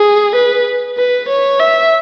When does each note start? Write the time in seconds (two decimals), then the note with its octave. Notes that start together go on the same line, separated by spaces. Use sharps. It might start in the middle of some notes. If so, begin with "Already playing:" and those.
Already playing: G#4
0.35 B4
0.97 B4
1.28 C#5
1.60 E5